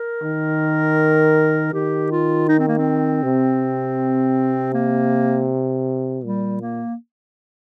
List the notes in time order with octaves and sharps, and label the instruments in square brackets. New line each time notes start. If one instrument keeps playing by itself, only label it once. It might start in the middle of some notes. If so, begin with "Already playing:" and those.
Already playing: [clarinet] A#4
[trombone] D#3
[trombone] D#3 [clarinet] G4
[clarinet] F4
D#4
C4
A#3
C4
[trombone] C3
[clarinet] A#3
[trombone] A#2 [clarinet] G3
[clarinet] A#3